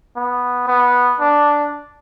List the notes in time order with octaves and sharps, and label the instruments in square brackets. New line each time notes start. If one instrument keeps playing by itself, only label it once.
[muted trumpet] B3
B3
D4